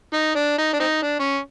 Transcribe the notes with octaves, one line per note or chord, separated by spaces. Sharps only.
D#4
D4
D#4
D4
C4 D#4
D4
C#4